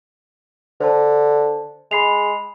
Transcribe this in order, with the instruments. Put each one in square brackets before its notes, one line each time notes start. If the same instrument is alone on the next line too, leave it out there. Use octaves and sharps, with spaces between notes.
[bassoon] D3 [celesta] C5 A5
[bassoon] G#3 [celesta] B5 C7 F7